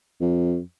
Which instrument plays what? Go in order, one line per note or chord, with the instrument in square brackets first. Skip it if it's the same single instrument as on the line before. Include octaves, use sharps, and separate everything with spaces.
[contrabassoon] F2